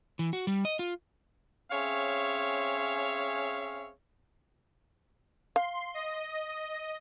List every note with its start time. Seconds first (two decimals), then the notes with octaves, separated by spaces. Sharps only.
0.19 E3
0.33 F#4
0.47 G3
0.65 D#5
0.79 F4
1.72 C4 C#4 G#4 C#5 E5 F5
5.56 F5 C6
5.94 D#5